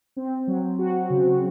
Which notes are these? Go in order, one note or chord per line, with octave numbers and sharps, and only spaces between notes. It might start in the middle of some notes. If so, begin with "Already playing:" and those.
C4
F#3
F#4
C#3